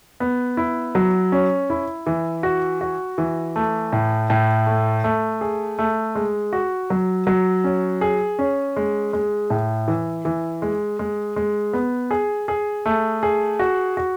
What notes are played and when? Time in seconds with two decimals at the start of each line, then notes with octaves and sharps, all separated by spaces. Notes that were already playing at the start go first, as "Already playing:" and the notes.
0.20 B3
0.57 E4
0.95 F#3
1.32 C#4
1.70 E4
2.06 E3
2.43 F#4
2.81 F#4
3.18 E3
3.56 A3
3.93 A2
4.30 A2
4.66 A3
5.04 A3
5.41 G#4
5.79 A3
6.15 G#3
6.53 F#4
6.90 F#3
7.27 F#3
7.64 C#4
8.01 G#4
8.39 C#4
8.76 G#3
9.13 G#3
9.50 A2
9.88 E3
10.25 E3
10.62 G#3
10.99 G#3
11.36 G#3
11.73 B3
12.11 G#4
12.48 G#4
12.86 A3
13.23 G#4
13.59 F#4
13.97 F#4